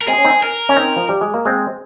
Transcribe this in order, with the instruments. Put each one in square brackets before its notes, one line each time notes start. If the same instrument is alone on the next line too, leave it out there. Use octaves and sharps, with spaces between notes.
[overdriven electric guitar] A#4
[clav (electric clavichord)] G#3 C4 [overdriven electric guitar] G#4
[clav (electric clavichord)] C#4
C4 D#4
[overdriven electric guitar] A#4
[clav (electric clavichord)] C#4
C4 D#4
F3
G3
G#3
A#3
G#3 C4